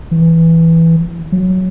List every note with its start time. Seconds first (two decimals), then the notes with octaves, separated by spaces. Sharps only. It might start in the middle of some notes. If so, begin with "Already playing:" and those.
0.11 E3
1.32 F#3